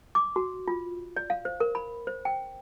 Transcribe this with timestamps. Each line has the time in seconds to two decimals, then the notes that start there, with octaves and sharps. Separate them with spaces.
0.15 D6
0.36 F#4
0.68 F4
1.17 D5
1.30 F5
1.45 C5
1.60 A#4
1.75 B5
2.07 C5
2.25 G5